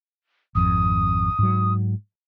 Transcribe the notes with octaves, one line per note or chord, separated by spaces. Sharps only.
G#1 F2 D#6
G#2 F#3